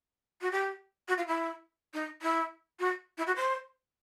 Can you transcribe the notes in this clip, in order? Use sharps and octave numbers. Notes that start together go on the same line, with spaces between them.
F#4
G4
F#4
F4
E4
D#4
E4
F#4
E4
F#4
C5